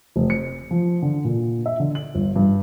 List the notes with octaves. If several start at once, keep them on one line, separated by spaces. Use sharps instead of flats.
F1
C#7
F3
D3
A#2
E5
D3
F#7
G1
G2